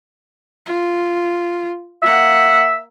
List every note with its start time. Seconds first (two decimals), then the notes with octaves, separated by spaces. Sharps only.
0.66 F4
2.03 A#3 E5 F#5